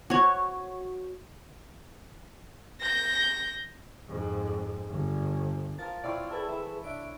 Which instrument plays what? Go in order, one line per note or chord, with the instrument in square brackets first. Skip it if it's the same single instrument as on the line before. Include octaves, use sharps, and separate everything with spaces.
[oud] F#4 C#5
[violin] G6 A#6
[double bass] F2 G#2
G1
[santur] F3 F5 A5 [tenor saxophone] A#4 [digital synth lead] A6
[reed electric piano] A#2 [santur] C4 E4 C#5 [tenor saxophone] F4 [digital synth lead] D5
[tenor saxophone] E4 [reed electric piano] G#4 B4 A5 [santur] A4
[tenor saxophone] E3 [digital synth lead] E5 [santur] B5
[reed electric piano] C2 E5 [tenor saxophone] D4 [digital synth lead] D7